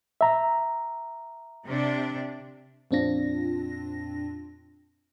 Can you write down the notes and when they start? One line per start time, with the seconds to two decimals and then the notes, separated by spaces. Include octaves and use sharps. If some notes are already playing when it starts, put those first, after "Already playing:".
0.21 E5 A#5
1.66 C3 D4
2.91 F2 A#2 C4 D4 F4 A#6